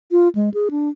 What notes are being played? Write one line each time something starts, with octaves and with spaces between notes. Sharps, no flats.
F4
G#3
G#4
D4